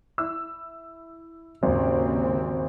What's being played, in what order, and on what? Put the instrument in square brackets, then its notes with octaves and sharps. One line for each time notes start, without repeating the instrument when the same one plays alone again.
[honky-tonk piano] E4 E6
[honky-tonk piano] G#1 [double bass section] D#2 C#3 C4